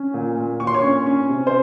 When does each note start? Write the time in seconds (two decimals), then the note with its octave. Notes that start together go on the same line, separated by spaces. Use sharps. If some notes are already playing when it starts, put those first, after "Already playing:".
Already playing: C#4
0.14 A#2
0.37 A#2
0.60 A#2 C#6
0.67 C6
0.74 C#5 C#6
0.83 C#4
1.06 C#4
1.29 C3
1.47 C5 C6